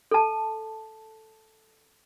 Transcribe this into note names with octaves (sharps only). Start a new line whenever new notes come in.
A4 A5